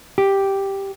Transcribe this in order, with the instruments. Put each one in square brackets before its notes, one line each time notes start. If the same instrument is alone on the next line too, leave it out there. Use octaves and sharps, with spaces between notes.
[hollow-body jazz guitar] G4